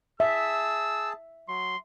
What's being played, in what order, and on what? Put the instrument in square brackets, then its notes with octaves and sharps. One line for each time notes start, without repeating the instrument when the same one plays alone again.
[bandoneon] G#4 A5 [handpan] E5 [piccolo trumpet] E6
[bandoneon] F#3 [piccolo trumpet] C6